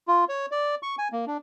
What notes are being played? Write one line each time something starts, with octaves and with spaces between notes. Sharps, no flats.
F4
C#5
D5
C#6
G#5
A#3
D4